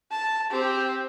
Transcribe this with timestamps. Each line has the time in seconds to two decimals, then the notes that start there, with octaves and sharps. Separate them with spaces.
0.12 A5
0.51 C4 G4